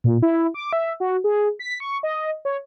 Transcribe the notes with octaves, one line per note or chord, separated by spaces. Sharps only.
A#2
E4
D6
E5
F#4
G#4
B6
C#6
D#5
C#5